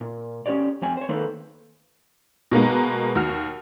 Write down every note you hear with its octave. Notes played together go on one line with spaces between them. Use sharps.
A#2
C#4 F4 G4 C#5 D5
F2 C4 G#5
C5 C#5
D#3 A#3 D#4 A4 B4 C5
B2 G#3 A#3 B3
D#2 F#4 F6